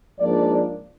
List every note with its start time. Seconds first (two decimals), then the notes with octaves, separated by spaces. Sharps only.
0.19 G#2 F3 A#3 D4 D5